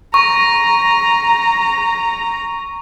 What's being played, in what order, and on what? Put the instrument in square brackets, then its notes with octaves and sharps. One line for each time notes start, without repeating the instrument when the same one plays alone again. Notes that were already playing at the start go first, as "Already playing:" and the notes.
[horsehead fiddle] A#5 [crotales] C#6